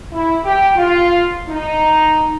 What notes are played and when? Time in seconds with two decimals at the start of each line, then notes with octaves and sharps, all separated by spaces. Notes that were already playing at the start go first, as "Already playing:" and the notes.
0.11 E4
0.43 G4
0.75 F4
1.47 D#4